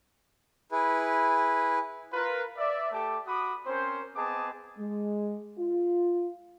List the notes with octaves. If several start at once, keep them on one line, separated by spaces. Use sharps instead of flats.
E4 G#4 B4
F4 A#4 B4
D5 E5
A3 G4 A4 A5 D6
F#4 B5 D6 D#6
C4 C#4 A#4 C5
B3 C4 G#4 D#5 A5 D6
G#3
F4